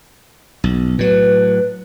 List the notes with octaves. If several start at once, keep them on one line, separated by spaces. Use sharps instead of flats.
B1
A2 F#3 B4